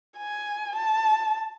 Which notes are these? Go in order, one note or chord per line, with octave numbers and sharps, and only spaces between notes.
G#5
A5